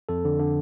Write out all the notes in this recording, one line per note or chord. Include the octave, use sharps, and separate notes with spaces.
F2 A4
D3
D3